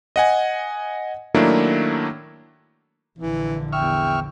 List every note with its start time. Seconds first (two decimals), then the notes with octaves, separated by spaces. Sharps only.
0.16 D#5 F#5 G#5
1.34 D#3 F#3 A3 A#3 D4 E4
3.19 A#1 D3 E3
3.73 E2 E5 G5 C#6 F6